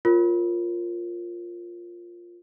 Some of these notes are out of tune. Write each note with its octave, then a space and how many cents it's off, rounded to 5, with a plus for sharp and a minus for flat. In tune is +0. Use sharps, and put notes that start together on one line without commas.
F4 +0 A#4 +0 C#5 -35